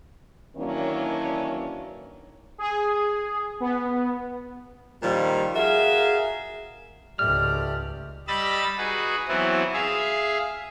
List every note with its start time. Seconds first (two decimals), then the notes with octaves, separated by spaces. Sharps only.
0.57 D#3 E3 F#3 A#3 C#4 D4
2.58 G#4
3.60 B3
5.03 A#2 D#3 F3 G3
5.56 F#4 G#4 A#4 E5 F5
7.19 C#2 G#2 A3 G4 D5 F6
8.28 G3 D#5 B5 E6 A6
8.78 D#4 F#4 G#4 B4
9.28 E3 F#3 B3 C4 E4
9.73 G#4 E5 F5